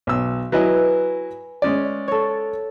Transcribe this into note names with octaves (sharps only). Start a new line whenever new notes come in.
B1 E6
F#3 E4 B4 D#5 G#5
G#3 C#4 D5
A4 C#5